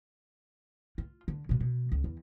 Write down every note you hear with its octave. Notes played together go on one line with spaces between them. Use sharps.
F4
D3
B2 G#3
B2
C#2
E2